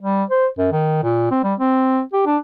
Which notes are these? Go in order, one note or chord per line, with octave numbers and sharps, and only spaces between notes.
G3
C5
F#2
D#3
A#2
C4
G3
C4
G4
D4